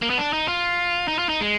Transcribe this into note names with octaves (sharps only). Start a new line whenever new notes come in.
A#3
B3
D4
D#4
F4
D#4
F4
D#4
G#3